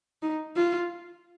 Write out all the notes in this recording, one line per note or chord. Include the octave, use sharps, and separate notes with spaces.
D#4
F4